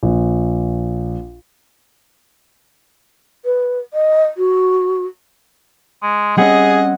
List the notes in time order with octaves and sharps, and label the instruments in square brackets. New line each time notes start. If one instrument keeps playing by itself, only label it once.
[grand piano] A#1
[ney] B4
D#5
F#4
[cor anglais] G#3
[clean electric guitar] G3 C4 C#4 [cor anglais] G#4 [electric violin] D#5 [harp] F#5